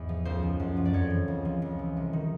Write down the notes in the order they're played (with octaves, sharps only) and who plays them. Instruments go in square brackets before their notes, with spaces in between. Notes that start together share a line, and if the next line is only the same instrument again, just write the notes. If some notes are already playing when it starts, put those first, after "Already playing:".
Already playing: [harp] E2 G#2
F3
C#2 C5
F3
F#2
F3
D5
F2 C#5
E3
C#2
F3
C#2
E3
C2
D#3